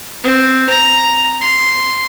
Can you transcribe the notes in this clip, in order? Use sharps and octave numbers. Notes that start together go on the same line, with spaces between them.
C4
A#5
C6